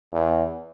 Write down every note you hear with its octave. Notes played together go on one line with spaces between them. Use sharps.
E2